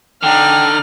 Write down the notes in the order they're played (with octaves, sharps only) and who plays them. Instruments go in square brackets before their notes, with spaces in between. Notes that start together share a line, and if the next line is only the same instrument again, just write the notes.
[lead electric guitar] D3 [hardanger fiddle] D#4 D5 [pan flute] G5 [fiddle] F6